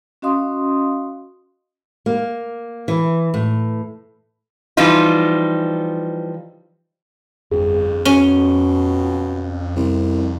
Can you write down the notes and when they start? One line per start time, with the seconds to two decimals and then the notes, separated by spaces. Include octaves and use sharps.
0.22 C#4 F#4 D#5 F5 C6 D#6
2.06 A#3
2.88 E3
3.34 A2
4.77 E3 F3 G3 D#4 F4
7.51 G1 F2 G#4
8.05 B2 C#4 G7
9.76 C2